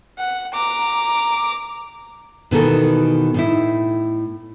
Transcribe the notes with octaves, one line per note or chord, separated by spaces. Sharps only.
F#5
A#5 D6
B2 D#3 E3 A4
A2 D#4 E4